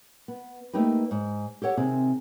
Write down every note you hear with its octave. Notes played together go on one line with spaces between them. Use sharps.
B3
A3 A#3 D#4 G4 B4
G#2
G4 A4 C#5 F#5
C3 D#3 C4 G#4